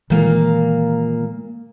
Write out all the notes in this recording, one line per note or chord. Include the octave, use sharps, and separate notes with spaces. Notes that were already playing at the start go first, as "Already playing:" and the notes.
A#2 D#3 E3 G#3 A#3